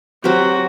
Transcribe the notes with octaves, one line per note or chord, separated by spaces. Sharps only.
F#3 C4 F#4 G4